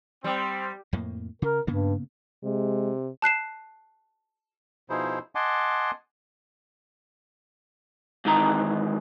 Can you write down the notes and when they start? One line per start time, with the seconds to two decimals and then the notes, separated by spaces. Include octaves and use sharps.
0.24 G3 C4
0.93 F2 A2 A#3
1.42 C#3 A#4
1.67 G2 C#3 A#3 B3
2.44 C3 G#3
3.22 A5 F#6 C7 E7
4.90 B2 F3 D#4 E4 G#4 C5
5.35 D#5 F#5 G#5 A5 C6 D6
8.25 G#2 D#3 E3 A#5